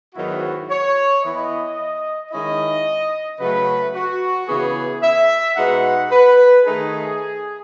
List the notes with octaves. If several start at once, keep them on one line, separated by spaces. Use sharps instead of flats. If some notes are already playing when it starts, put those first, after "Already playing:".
G#2 D#3 F#3 B3 E4 F#4
C#5
E3 B3 E4 D#5
D#3 G#3 C#4 E4 D#5
C#3 F#3 A3 B4
F#4
C#3 E3 B3 G#4
E5
B2 G#3 D#4 F#5
B4
D#3 A3 D#4 G#4